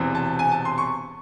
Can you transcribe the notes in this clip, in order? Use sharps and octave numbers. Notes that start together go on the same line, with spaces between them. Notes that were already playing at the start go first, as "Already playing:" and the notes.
Already playing: E1 E2 C3 E3 C4
A5
G#5
A5
C6
C#6